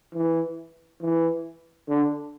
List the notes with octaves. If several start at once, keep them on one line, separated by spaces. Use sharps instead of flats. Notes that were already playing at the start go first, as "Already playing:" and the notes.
E3
E3
D3